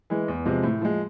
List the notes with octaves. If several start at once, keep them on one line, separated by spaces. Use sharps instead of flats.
E3 G#3
E2
C3 F3 G#3
A2
F3 G#3